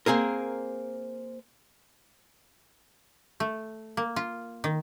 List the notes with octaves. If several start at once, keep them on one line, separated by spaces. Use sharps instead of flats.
A#3 C4 G#4 A#4
A3
A#3
F4
D#3